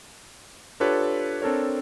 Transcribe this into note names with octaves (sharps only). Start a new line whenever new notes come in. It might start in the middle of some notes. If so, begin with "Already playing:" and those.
D4 F4 G4 A4 B4 C#5
C4 D4 A4 A#4 C#5